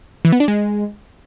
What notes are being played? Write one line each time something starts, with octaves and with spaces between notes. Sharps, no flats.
E3
B3
D4
G#3